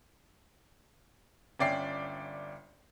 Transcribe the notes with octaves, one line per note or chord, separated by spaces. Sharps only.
G1 C#4 D5 E5 G5 C7